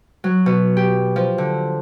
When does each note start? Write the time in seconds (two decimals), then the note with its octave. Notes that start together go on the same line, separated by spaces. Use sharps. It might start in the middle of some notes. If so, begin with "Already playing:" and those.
0.24 F#3
0.46 B2
0.77 G4
1.16 F3
1.38 D3